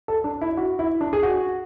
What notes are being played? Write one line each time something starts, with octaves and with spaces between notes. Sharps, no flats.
A4
D4
E4
F#4
E4
D4
G#4
F#4